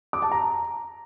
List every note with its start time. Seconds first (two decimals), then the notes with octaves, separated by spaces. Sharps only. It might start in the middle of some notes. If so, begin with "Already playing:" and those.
0.13 D6
0.22 A5
0.32 A#5